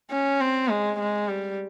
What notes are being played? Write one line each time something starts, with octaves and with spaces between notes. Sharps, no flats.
C#4
C4
G#3
G#3
G3